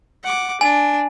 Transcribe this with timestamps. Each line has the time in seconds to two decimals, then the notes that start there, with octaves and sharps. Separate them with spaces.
0.23 F#5 D6
0.61 D4 G#5